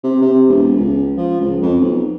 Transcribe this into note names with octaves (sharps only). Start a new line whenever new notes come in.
C3
C3
E1
C#2
F3
C#2
F2
B1